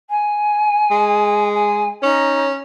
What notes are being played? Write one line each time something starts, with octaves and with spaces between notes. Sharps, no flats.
G#5
G#3
G#5
C#4 D#4